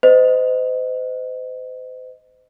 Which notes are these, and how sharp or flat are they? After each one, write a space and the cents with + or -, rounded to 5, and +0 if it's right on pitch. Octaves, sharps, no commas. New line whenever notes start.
C5 -35 D#5 +0